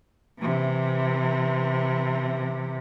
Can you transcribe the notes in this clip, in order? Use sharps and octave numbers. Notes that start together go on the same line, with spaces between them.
C3 E3